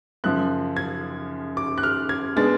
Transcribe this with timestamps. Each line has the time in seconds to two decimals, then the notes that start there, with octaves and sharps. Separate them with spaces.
0.24 F#2 C#3 F3 F#6
0.76 G#6
1.57 D6
1.78 F#6
1.83 F6
2.09 G#6
2.36 B2 G#3 B3 D4 A6